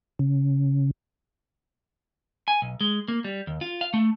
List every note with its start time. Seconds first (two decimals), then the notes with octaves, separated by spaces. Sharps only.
0.19 C#3
2.48 G#5
2.62 B1
2.81 G#3
3.08 A#3
3.24 G3
3.47 D#2
3.61 F4
3.81 F5
3.94 A3